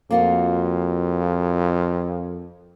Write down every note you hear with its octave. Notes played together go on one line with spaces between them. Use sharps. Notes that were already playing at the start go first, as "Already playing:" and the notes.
F2 A#3 F4 F#4